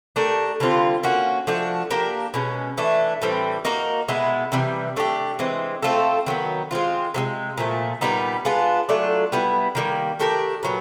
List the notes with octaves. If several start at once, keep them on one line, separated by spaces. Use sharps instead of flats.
A3 D4 G4 A#4
D3 G3 C4 F4
A#3 C#4 F#4
F3 A3 D4 F#4
A#3 D4 G4 A#4
B2 G#3 C#4
E3 A3 D4
A2 E3 G3 C4
A#3 D#4 F#4 A#4
B2 G#3 B3 E4
C3 E3 G3
A3 D4 G4
E3 G#3 C4
A3 C4 F4 A4
D#3 F#3 B3
G#3 C4 F4
C3 E3 G#3
A#2 F3 A3
A#2 G3 B3 D#4
G#3 B3 D4 F4
F#3 A3 D4 F4
G3 B3 E4
D#3 G3 A#3
A3 D4 G4 A#4
A#2 F#3 B3